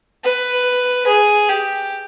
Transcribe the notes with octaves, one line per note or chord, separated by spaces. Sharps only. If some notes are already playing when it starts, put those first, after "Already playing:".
B4
G#4
G4